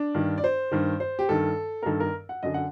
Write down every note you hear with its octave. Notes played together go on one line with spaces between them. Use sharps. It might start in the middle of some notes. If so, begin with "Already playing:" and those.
Already playing: D4
G2 D#3
D5
C5
G2 D#3
C5
G4
G2 D#3 A4
A#4
G2 D#3 A4
A#4
F#5
F#2 D3 D#5
F#5